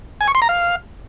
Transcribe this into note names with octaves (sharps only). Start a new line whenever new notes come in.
G#5
C#6
C6
A#5
F5